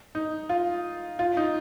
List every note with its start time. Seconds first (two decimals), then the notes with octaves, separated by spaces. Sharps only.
0.15 D#4
0.49 F4
1.19 F4
1.37 D#4